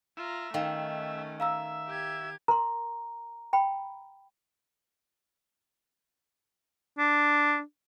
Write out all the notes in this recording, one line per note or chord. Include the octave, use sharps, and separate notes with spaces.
F4 E5 A#5
D#3 A3 C#4 F5 G5
E5 F5 A#5 E6
G4 G#6
A#4 A#5 C6
G5 B5
D4